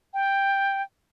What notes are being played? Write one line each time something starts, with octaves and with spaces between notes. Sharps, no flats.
G5